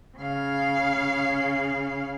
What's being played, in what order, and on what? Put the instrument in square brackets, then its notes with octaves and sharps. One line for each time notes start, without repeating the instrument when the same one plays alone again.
[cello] C#3 F5